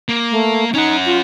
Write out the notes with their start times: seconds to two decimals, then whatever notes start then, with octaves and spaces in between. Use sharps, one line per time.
0.09 A#3
0.31 A3
0.74 C#4 D#4 F#5
1.06 F4